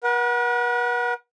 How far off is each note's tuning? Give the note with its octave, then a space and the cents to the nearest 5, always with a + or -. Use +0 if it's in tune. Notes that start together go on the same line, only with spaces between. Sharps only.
B4 -45 F#5 +0